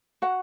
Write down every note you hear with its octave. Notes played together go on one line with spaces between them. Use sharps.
F#4 F#5